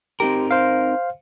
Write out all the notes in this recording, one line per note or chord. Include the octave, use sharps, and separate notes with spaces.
C4 D#4 G4 A#4
C5 F5